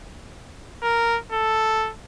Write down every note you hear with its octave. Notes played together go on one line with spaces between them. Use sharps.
A#4
A4